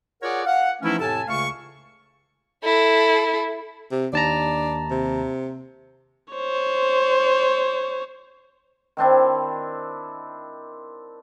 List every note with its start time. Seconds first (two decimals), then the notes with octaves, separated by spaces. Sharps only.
0.22 F4 G#4 A#4 C#5 D5 F#5
0.45 F5 F#5
0.82 E3 F3 A3 C#4 D#4 E4
1.00 F2 A2 C3 A4 G#5 A5
1.28 C#2 C#3 A3 F5 C#6
2.63 E4 A4
3.91 C3
4.13 D#2 D4 A5 A#5
4.90 C3
6.34 C5 C#5
8.97 D#3 C4 D4 E4